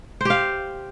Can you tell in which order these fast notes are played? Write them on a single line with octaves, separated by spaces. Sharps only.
C5 G4 F5